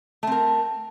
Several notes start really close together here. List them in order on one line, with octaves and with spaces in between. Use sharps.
A3 C4 A#4